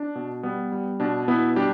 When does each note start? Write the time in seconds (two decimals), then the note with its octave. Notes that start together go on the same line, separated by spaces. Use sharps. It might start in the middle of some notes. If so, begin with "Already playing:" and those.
Already playing: D4
0.15 B2
0.43 G3 B3
0.72 G3
1.00 B2 D4
1.28 B2 B3 E4
1.56 G3 D4 G4